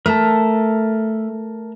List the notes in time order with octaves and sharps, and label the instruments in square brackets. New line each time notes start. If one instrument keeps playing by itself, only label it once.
[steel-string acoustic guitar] A3 [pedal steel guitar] A#4 A5